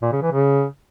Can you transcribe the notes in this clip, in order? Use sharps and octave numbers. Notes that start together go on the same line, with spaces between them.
A#2
C#3
E3
C#3